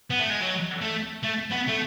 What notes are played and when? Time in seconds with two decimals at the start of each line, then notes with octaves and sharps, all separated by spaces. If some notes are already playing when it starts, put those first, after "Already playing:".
0.10 B3
0.19 A3
0.30 G#3
0.41 F#3
0.81 A3
1.23 A3
1.51 B3
1.67 A3